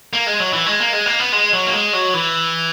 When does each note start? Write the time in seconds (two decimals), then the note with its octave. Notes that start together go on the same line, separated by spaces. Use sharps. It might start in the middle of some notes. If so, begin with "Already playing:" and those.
0.13 A#3
0.27 G#3
0.40 F#3
0.53 E3
0.66 G#3
0.80 A#3
0.93 G#3
1.06 A#3
1.19 B3
1.32 G#3
1.53 F#3
1.67 A#3
1.73 G#3
1.93 F#3
2.14 E3